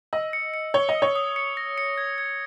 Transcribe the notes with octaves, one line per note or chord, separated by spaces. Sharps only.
D#5 E6
C#7
C#7
C#5 G7
D#5
D#6
C#5
D#6
C#7
A#6
C#7
G#6
G#6